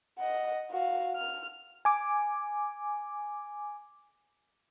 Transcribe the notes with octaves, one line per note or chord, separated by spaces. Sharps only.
D#5 F#5
F#4 F5
F6
G#5 D6